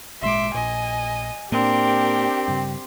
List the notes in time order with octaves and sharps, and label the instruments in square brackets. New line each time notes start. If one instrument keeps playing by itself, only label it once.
[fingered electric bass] G#1 A#2 G#3 [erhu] E5 [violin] C6 D6
[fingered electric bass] A#1 A#2 [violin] D#5 [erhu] G#5
[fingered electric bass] A2 A#3 [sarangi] C4 [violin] D4 A#4 [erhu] G4
[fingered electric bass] G2 C#3